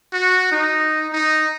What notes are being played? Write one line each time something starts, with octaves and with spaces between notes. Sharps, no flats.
F#4
D#4
D#4